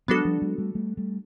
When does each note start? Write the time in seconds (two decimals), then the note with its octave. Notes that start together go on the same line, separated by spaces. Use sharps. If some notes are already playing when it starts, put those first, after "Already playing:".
0.08 F#3 G#3 B3 D4 F#4 A4
0.25 F3 G3
0.42 F#3 G#3
0.58 G3 A3
0.75 G3 A3
0.97 G3 A3